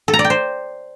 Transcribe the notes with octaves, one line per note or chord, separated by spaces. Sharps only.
A4
A#5
D5
G5
C5